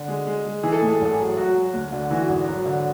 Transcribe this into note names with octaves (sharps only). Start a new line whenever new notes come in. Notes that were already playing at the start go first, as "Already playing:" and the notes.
Already playing: D3
G#3
G#3
G#3
E3 G#4
A4
A2 G#4
A4
G#4
G#1 A4
G#4
F#3
F#3 F#4
F#3
D2
D3
E3 F#4
G#1
F#3
D3